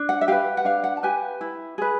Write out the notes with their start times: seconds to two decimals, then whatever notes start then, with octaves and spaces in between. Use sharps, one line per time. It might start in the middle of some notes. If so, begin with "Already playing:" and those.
Already playing: D4
0.09 F#5
0.21 E5
0.28 G4 B4 F5
0.57 F#5
0.65 D4 F5
0.84 F#5
0.97 A5
1.03 G4 B4 G#5
1.41 E4
1.78 G#4 B4